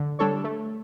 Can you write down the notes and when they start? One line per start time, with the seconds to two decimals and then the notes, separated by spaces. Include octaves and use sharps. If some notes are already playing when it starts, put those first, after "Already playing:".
Already playing: D3
0.19 G3 D4 A4 C#5
0.44 A3